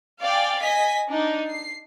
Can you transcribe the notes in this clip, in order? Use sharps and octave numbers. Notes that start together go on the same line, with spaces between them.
D5 F5 G5 G#5
D#5 G#5 B6
D4 D#4
C7